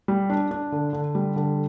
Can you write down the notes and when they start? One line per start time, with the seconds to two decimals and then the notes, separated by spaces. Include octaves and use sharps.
0.08 G3
0.30 D4
0.51 D4
0.72 D3
0.93 D3
1.15 G3
1.36 D3